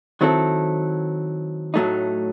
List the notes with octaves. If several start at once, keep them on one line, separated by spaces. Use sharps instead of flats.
D#3 F#3 C4 E4 A4
A2 F#3 A3 D#4